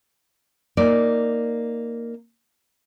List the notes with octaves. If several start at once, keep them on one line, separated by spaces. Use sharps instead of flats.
A#3 D#4 D5